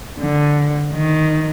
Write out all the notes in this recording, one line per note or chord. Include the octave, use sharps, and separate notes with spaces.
D3
D#3